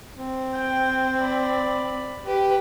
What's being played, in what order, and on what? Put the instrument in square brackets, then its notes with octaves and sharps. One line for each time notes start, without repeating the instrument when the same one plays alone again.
[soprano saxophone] C4
[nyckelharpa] G5
D5 B5
[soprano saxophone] G4 [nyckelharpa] B4